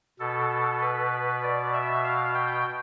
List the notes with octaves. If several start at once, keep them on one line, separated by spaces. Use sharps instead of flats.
B2 A4
B4
D5
E5
F5
G5